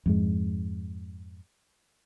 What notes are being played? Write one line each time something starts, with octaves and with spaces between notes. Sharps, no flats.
F2 G#2 G#3